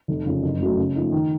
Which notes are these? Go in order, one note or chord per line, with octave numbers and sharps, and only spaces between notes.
F1
F2 C#3 F3
F#1
F#2 C#3 F#3 A3
C#3
F3 A3 D#4
D#3